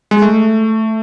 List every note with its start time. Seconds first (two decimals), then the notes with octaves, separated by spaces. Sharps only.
0.11 G#3
0.22 A3